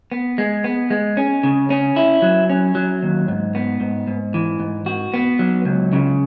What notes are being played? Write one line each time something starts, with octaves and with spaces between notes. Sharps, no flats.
B3
G#3
B3
G#3
C#4
C#3
C#4
E4
F#3
C#4
F#3
D#2
G#2
B3
G#2
G#2
E3
G#2
F#4
B3
F#3
C#2
C#3